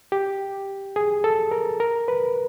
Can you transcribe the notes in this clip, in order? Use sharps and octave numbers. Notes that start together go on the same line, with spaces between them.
G4
G#4
A4
A#4
A#4
B4